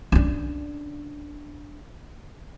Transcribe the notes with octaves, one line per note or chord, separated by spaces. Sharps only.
C#4 D4